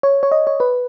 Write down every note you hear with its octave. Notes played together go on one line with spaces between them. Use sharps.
C#5
C#5
D#5
C#5
B4